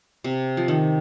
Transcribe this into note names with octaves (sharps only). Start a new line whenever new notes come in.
C3
F3
D#3